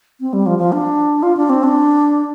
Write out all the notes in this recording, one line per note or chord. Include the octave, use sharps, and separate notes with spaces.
C4
G3
F3
F3
D4
F4
D4
C4
D4